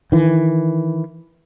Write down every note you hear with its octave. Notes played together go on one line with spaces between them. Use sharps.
D#3 E3